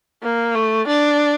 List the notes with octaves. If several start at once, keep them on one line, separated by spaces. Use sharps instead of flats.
A#3
A3
D4